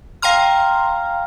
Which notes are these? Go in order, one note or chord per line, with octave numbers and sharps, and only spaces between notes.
F5 G5 A#5 C6 F6